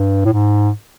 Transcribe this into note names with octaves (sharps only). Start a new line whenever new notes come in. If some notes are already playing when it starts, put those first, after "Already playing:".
Already playing: G2
A2
G#2